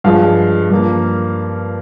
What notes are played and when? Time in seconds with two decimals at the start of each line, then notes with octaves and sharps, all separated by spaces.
0.04 G2 F3 G#3 F5
0.70 G2 F3 A#3